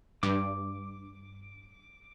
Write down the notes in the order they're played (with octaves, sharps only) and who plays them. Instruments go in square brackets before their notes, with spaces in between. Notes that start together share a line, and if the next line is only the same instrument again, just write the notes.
[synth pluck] G2 [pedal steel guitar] D6